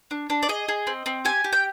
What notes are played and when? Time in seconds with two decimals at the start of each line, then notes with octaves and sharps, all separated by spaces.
0.11 D4
0.30 D4
0.43 D5
0.49 G#4 D#5
0.69 G#4
0.87 C4
1.06 C4
1.25 G4 G#5
1.44 G4
1.53 G5